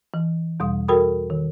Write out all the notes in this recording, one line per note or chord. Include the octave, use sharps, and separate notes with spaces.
E3
E2 B2 G3 D#6
F#4 A4 A#4 G5 B5 D#6
D#3